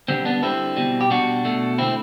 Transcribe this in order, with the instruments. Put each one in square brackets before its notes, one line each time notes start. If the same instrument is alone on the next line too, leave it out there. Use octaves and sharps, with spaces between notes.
[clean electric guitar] D3 G3 C4
B3 D4
D3 G3 C4 E4
B2 G3
G4
B2 G3 D4 F#4
B2 A3
D3 A3 C4 E4